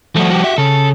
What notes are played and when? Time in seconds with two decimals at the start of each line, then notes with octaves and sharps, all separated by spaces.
0.16 F3 G3 A3 F#4
0.30 F#4 G4
0.44 E5
0.58 C#3 A4